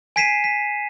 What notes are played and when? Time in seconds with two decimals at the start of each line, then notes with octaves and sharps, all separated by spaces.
0.16 G#5 G#6 B6 C7 D#7 E7
0.44 B6